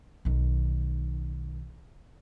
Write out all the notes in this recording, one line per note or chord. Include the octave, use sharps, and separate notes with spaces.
B1 D#3